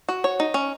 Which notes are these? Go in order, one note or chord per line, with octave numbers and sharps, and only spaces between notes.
F#4
C#5
D#4
C#4